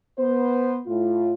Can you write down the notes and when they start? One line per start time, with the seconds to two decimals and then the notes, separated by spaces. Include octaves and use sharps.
0.18 B3 C5
0.86 A2 F4